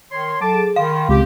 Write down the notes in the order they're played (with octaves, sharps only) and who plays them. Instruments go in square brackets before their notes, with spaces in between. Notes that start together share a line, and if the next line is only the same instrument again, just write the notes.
[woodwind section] D#3 C#5 C6
[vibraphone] F#3 A4 [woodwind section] A5 D6
[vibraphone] G#4
[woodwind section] D#3 [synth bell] F5 [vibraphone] B5 C6
[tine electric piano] C#2 [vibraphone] C4 [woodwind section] G4